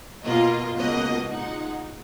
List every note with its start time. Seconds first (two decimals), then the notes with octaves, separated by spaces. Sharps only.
0.26 B2 A#3 F4 D#5
0.79 C#2 B2 A#3 D#5
1.32 A#2 G#3 D#4 F#5